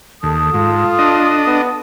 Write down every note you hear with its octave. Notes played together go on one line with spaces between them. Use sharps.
D#2 A4 A5 D#6
G#2 F4
D4 D#5
B3